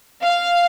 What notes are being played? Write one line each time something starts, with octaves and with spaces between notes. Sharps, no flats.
F5